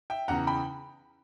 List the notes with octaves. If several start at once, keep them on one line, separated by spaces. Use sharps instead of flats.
E5 G5
E2 C#3 E3 F#5 A#5
G5 B5